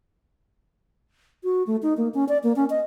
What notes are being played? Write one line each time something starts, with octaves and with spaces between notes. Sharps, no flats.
F#4
A3
D#4
A#3
C#4
D5
A#3
C#4
D#5